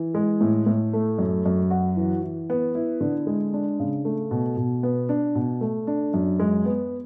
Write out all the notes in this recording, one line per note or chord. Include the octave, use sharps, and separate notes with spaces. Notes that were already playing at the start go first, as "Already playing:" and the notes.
Already playing: E3
G#3
A2
A2
A3
F#2
F#2
F#4
E3
E3
B3
E4
D3
G#3
D4
C#3
A3
B2
B2
B3
D4
B2
A3
D4
F#2
G#3
B3